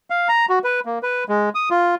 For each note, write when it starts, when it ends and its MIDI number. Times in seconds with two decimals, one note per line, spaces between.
0.10 0.28 77
0.28 0.46 82
0.49 0.59 66
0.64 0.80 71
0.85 0.99 58
1.03 1.24 71
1.29 1.49 56
1.55 1.69 87
1.70 1.95 65